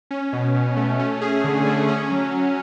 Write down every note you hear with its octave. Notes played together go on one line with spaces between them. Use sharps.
C#4
B2
B2
A3
C#4
G#4
D3
A3
C#4
F#3
F#3